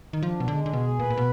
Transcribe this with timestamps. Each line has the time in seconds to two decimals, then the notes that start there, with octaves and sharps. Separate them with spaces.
0.13 D#3
0.22 F3 D4
0.40 B2
0.48 D3 G#3
0.66 D3
0.73 B2 G#4
0.99 A#2 B4
1.10 A#2
1.17 B2